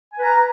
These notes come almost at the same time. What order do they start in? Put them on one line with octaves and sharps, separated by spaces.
G#5 B4 A#5